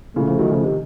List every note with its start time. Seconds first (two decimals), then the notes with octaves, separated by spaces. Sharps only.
0.16 A#2 C#3 A3
0.27 C#3 F3
0.39 D#3 F#3
0.51 C#3 F3
0.63 C3 D#3